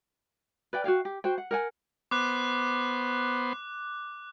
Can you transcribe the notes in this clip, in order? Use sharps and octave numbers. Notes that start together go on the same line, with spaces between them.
B4 D5 G5
F#4 G#4 F5 G5
G4
F#4 C5 G5
F#5
A#4 F#5 G#5
B3 C5 D6 F#6